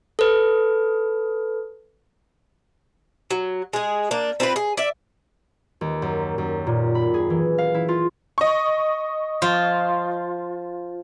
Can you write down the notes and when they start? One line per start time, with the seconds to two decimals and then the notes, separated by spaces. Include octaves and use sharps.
0.19 A4 B4
3.31 F#3
3.73 G#3 G#4
4.11 A#3 D4
4.40 C4 D4 F4 B4
4.56 G#4
4.77 D5 E5
5.81 D#2
6.02 F#2
6.38 F#2
6.67 A#2
6.95 B5
7.14 G#4
7.30 E3
7.58 F5
7.74 E4
7.88 F4
8.38 D#5 C#6
9.42 F3 F4